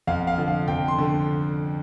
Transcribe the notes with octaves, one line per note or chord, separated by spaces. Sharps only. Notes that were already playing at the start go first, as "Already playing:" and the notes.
F2 F5
F5
D3 F3
F5
F2 G5
C6
D3